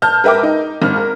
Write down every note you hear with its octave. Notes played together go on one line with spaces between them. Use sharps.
A5 F6 G6
A#4 B4 E5 G5 D6
D#4
G#1 F6
A#4